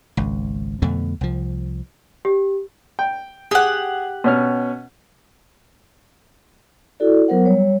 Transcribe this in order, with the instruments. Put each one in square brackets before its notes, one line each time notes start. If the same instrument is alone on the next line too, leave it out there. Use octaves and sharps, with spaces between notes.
[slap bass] G#1 C#2
F2 B2 D3 A3
C2 F3
[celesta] G4
[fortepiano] G5
[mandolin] G4 F#5 [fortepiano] G#4
[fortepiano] B2 C#4 F6
[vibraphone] E4 F#4 A4 D5
F#3 B3 A#4 C5 F#5
G3 C#5